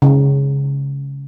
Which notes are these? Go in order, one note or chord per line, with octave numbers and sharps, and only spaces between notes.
C#3